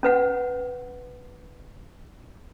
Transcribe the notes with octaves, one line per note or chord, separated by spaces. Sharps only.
C#4 B4 F#5